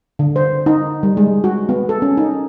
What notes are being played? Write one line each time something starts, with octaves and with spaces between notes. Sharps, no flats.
D3
C5
D#4
G3
G#3
F#4
B3
A4
C#4
D#4